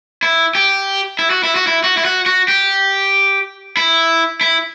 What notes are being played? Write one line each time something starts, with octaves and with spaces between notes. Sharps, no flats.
E4
G4
E4
F#4
E4
F#4
E4
F#4
E4
F#4
F#4
G4
E4
E4